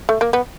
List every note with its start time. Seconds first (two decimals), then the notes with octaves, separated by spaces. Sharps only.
0.09 A3
0.21 A#3
0.33 B3